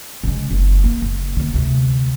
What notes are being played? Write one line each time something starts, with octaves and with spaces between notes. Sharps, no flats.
C#3 G#3
F#1
A#3
F#1
D3 A#3
D2 C3